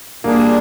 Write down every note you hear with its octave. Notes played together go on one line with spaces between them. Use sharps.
A#2 G3 A#3 D4 G#4